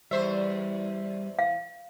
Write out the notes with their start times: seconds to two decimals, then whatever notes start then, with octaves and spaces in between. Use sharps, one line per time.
0.11 E2 G3 C5 E5
1.39 F5